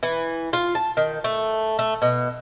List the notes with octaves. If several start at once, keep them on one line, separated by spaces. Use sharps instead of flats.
E3
F4
A5
D#3
A3
A3
B2